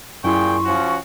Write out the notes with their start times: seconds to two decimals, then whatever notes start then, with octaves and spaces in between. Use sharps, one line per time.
0.24 F#2 A#2 E4 G#4 G5 C6 C#6
0.65 F3 C#4 F#4